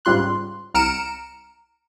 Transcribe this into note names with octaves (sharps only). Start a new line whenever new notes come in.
G#2 C#3 G3 F4 C6 F#6
C2 A#5 F6 C#7 D7 E7